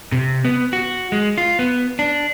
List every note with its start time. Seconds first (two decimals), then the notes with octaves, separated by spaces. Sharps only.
0.12 C3
0.45 B3
0.73 F#4
1.12 G#3
1.38 F4
1.59 B3
1.99 D4